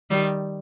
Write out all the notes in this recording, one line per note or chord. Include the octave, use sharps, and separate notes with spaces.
D#3 G3